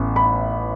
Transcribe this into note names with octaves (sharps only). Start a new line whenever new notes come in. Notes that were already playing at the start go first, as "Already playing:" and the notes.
Already playing: A1 A2 B3
B5